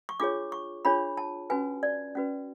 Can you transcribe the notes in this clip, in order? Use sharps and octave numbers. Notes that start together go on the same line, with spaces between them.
C#6
D4 F4 G#4 C#5 D6
C#6
D4 F4 G#4 C#5 B5
A5
C#4 F#4 B4 G#5
D5
C#4 F#4 B4